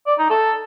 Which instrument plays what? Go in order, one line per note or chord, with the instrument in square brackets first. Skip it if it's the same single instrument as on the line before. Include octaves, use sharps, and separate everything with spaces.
[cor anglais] D5
D#4
A4